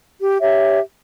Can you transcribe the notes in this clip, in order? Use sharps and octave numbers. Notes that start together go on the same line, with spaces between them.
G4
G4 C#5 E5